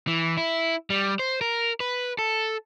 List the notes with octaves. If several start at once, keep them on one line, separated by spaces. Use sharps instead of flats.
E3
E4
G3
C5
A#4
B4
A4